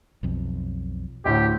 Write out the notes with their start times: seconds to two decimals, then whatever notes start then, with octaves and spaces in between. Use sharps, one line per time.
0.23 B1 F2
1.25 D2 A2 G4